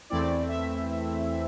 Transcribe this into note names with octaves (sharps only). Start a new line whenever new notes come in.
E2 E3 A3 C4 E4 D5
E5